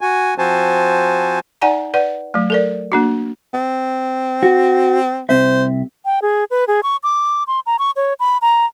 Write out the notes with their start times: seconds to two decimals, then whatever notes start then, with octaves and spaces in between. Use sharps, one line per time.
0.01 F#4 G#5
0.38 F3 C4 F#4 C5 G#5 A5
1.61 D#4 D5 F#5 G#5 A#5
1.94 B4 D5 F#5
2.34 F#3 A3
2.50 A4 A#4 D5
2.92 A#3 D4 F#4
3.54 C4
4.43 F#4
5.29 C2 C4 C5 E5
6.05 G5
6.22 G#4
6.51 B4
6.68 G#4
6.83 C#6
7.03 D6
7.47 C6
7.66 A#5
7.79 C#6
7.96 C#5
8.20 B5
8.42 A#5